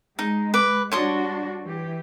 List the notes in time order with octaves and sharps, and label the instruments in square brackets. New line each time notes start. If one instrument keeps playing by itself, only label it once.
[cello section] G#3 [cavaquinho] D#4
[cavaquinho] B4 D6
[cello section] G3 D4 F#4 [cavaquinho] C#5 C6 D#6
[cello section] E3 G4